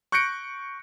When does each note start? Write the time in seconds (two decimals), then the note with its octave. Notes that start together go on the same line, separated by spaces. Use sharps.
0.12 C#6 F#6 G6 A#6 C#7 D7